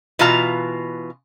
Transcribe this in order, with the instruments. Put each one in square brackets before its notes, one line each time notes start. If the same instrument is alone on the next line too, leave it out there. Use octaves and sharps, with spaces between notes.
[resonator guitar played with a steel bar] B2 E3 F4 F5 A#5